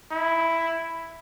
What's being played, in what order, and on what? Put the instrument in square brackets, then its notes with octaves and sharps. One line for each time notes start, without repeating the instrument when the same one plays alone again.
[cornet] E4